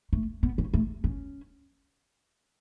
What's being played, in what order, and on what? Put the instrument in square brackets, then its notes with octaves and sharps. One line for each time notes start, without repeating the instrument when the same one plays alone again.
[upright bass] A3
B3
C#4
A3
C#4